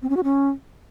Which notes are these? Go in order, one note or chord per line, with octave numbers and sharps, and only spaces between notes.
C4
C#4
F#4
C#4